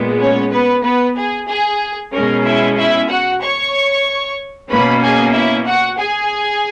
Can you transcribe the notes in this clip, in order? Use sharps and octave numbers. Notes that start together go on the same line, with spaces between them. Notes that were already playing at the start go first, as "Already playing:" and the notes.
Already playing: A#2 G#3 B3
C#4 C#5
B3 B4
B3 B4
G#4
G#4
B2 G#3 C#4 A#4
E4 E5
E4 E5
F#4 F#5
C#5 C#6
B2 A#3 C#4 B4 B5
G#4 G#5
E4 E5
F#4 F#5
G#4 G#5